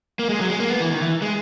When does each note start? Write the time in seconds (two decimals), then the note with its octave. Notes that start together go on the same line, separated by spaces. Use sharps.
0.19 A#3
0.29 G#3
0.40 F#3
0.50 G#3
0.60 A#3
0.70 B3
0.80 E3
0.91 D#3
1.02 E3
1.22 G#3